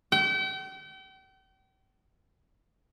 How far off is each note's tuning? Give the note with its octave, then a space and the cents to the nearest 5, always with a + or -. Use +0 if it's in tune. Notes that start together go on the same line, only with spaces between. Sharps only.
G5 -40